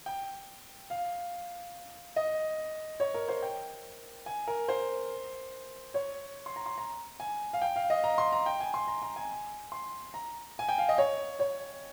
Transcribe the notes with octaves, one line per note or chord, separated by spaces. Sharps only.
G5
F5
D#5
C#5
A#4
C5
G5
G#5
A#4
C5
C#5
C6
A#5
C6
A#5
G#5
F5
G5
F5
D#5
A#5
C6
A#5
G5
G#5
C6
A#5
A#5
G#5
C6
A#5
G#5
G5
F5
D#5
C#5
C#5